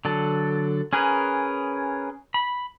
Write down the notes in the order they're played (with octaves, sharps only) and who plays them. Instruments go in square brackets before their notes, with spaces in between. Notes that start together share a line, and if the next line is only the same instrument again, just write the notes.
[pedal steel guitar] D3 F#3 A4
C#4 G#4 A#4 B4
B5